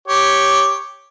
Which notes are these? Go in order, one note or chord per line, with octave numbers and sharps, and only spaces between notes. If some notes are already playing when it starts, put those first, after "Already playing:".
G4 C#5